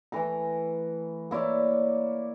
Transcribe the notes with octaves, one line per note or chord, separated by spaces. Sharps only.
E3 A3 A#5
A#3 E4 C#5 D5